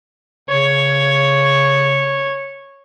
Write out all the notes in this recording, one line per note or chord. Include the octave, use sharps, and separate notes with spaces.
C#3 C#5